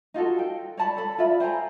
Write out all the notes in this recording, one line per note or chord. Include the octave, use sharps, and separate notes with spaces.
D#4 F4 F#4 A4
G5
C#5 D5 A5 B5
A4 B5
F4 D5 E5 B5
C5 G5 G#5 A#5